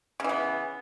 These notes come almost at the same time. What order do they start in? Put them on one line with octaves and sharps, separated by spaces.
C#3 E3 B3